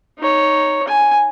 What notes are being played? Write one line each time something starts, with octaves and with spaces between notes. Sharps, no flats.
D#4 C#5
G#5